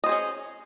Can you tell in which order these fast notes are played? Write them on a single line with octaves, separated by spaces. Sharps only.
D#5 C5 G#4 C#4